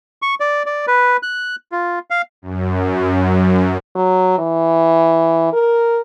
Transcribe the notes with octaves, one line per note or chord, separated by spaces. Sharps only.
C#6
D5
D5
B4
F#6
F4
F5
F#2
F#3
E3
A#4